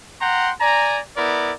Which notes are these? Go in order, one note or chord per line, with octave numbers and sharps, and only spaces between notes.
F#5 G5 A#5 C6
D5 G#5 A#5
B3 E4 A#4 D5